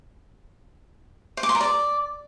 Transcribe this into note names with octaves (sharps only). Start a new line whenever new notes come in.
C5
D6
C6
A#4
D5